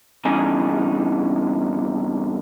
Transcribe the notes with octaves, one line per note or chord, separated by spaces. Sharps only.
E2 G2 C#3 D#4 G#5